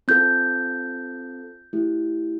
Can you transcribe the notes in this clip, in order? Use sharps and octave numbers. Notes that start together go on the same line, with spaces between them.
C4 F4 A4 G6
A3 E4 G4